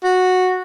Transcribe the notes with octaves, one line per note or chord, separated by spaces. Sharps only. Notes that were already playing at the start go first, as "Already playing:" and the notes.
F#4